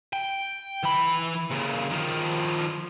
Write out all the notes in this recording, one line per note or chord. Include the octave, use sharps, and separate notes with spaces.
G5
E3 B5
C#2 A#2
D#3 F3